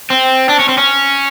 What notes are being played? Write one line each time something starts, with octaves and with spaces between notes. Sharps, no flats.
C4
D4
C#4
C4
C#4